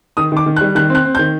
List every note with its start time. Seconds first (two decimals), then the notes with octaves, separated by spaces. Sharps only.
0.17 D#3 D#6
0.32 D#3 D6
0.46 D#3
0.56 F#6
0.61 G3
0.75 D#3 F#6
0.90 C4
0.95 F#6
1.05 C4
1.15 G6
1.19 D#3